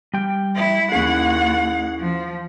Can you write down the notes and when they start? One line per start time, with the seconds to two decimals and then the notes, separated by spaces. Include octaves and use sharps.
0.13 G3 G5
0.56 E4
0.92 D#2 C#4 E4 G#4 F#5
1.99 F3